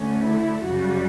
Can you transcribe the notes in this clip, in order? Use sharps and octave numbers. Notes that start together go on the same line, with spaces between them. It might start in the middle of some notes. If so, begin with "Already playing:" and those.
Already playing: D2 D3 A3 C#4
E4
F#2 C#3 G3 F#4